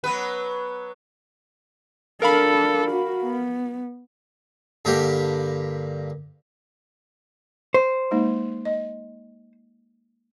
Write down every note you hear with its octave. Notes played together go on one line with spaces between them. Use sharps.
F#3 B3 B4
D4 A4 A#4 F5 B5
F#4
B3
G2 D3 A#3 G4
C5
G#3 A#3 D#4
D#5